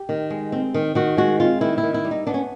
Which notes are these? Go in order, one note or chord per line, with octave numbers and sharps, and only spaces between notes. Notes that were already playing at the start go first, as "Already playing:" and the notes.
Already playing: G4
D#3
G#3
C4
D#3
D#3 F#4
G#3 F#4
C4 F4
D#3 E4
E4
D#3
E4
G3
D#4
B3 D4
C#4